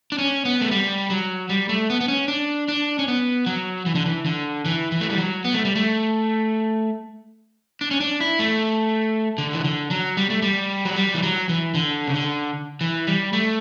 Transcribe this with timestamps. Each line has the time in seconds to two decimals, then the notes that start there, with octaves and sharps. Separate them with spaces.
0.12 D4
0.18 C#4
0.45 B3
0.61 A3
0.71 G3
1.10 F#3
1.50 G3
1.69 A3
1.90 B3
2.01 B3
2.08 C#4
2.28 D4
2.68 D4
2.99 C#4
3.08 B3
3.46 F#3
3.86 E3
3.95 D3
4.06 E3
4.26 D3
4.65 E3
4.92 E3
5.01 A3
5.10 G3
5.18 F#3
5.44 B3
5.54 A3
5.65 G3
5.75 A3
7.81 D4
7.91 C#4
8.01 D4
8.21 E4
8.39 A3
9.38 D3
9.53 E3
9.64 D3
9.91 F#3
10.17 G3
10.30 A3
10.42 G3
10.85 F#3
10.96 G3
11.14 E3
11.23 F#3
11.49 E3
11.75 D3
12.07 C#3
12.15 D3
12.81 E3
13.07 G3
13.33 A3